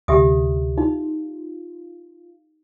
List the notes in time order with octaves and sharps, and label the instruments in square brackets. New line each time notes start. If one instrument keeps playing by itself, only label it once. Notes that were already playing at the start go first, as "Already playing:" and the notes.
[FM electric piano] D2 C3 [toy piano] G4 E5 D#6
[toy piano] D#4 [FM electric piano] F4